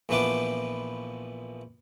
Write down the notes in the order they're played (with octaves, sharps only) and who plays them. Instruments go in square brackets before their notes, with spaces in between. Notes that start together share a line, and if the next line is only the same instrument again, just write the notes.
[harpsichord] A#1 E3 F3 B3 B4 D6